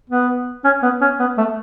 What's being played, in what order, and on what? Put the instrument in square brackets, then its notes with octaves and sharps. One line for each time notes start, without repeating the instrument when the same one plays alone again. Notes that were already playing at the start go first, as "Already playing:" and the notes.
[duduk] B3
C#4
B3
C#4
B3
A3